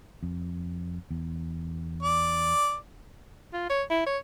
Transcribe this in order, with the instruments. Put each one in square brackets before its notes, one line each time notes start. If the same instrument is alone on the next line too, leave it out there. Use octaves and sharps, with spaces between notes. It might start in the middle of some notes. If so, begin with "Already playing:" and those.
[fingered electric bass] F2
E2
[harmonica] D5
[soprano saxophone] F4
C#5
E4
C#5